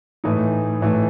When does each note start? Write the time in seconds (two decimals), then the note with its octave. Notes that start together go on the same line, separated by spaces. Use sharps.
0.24 A2 E3 A3 D#4
0.81 A2 E3 A3 D#4